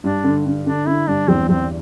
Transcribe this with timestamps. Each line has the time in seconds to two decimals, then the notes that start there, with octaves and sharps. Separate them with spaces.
0.03 G2 D4
0.24 D3
0.46 D3
0.66 D3 D4
0.86 D3 E4
1.08 G2 D4
1.28 E2 C4
1.49 E2 C4